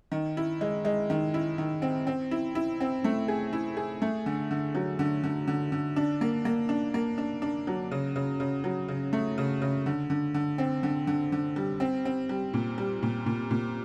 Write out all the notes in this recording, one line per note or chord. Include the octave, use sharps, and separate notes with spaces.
D#3
E4
G#3
G#3
D#3
E4
D#3
C4
C4
E4
E4
C4
A3
G#4
E4
G#4
A3
D3
D3
F#3
D3
D3
D3
D3
D4
A#3
A#3
D4
A#3
D4
D4
F#3
C#3
C#3
C#3
F#3
C#3
A3
C#3
C#3
D3
D3
D3
C4
D3
D3
D3
G3
C4
C4
G3
A#2
G3
A#2
A#2
A#2